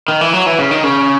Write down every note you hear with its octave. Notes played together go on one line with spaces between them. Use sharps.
D#3
E3
F#3
E3
C#3
D#3
C#3